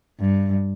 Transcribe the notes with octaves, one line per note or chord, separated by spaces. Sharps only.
G2